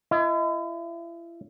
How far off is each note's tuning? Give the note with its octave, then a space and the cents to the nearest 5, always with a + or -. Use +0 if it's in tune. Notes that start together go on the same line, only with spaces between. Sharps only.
E4 +40 D#5 +25